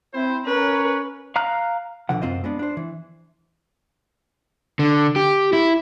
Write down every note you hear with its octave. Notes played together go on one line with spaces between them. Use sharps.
C4 E4 C5
C#4 A#4 B4 C#5
F5 A#5 F6 F#6
B1 B2 D3 F3 F#5
F#2 C3 C4 F4 C5 D#5
G#3 B3 D4
D4 C5
E3
D3
G4
E4